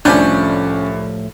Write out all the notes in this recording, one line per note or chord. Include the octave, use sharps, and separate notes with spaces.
C2 A2 F3 A3 C#4 D4 D5 G6